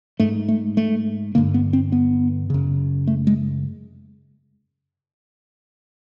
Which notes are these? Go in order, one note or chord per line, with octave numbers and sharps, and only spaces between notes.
G#2 A3
A3
A3
G2 D3 A#3
B3
C4
B3
F#2 C#3
A3
G#3